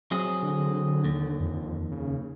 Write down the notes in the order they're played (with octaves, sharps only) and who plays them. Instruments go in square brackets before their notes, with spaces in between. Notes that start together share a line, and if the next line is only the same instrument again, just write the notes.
[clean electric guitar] F#3 C4 G#4
[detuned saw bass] D3
[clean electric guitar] D#2
[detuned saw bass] F2
C#3